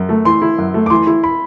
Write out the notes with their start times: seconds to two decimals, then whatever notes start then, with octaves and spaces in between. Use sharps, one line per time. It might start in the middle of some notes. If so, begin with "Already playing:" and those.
Already playing: F#2
0.09 A3
0.25 E3 C6
0.42 E4
0.58 F#2
0.74 A3
0.86 D6
0.90 E3 C6
1.07 E4
1.24 B5